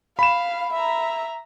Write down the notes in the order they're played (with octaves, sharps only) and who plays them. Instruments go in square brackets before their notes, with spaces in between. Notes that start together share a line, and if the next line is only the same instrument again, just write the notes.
[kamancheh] F5 [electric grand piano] B5 E7
[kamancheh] E5 A#5